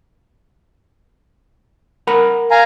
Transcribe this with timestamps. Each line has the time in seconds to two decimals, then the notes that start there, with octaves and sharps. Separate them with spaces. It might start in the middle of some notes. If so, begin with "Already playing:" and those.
2.07 A#4 F#5 B5
2.51 F5 G#5 A#5